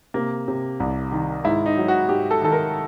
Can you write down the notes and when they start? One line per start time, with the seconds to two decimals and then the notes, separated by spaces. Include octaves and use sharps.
0.14 C3 A#3
0.48 C3
0.80 C2
1.12 D#3
1.44 G#2 E4
1.66 D#4
1.77 F#3
1.88 F#4
2.09 G#2 G4
2.31 A4
2.42 D#3 A4
2.52 A#4